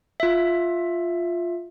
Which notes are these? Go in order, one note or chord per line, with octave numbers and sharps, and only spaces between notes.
F4 E5